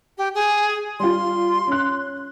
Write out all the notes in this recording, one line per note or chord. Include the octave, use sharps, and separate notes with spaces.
G4
G#4
G3 F4 C6
C#4 F#6